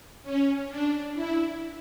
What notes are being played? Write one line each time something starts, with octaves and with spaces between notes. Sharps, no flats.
C#4
D4
E4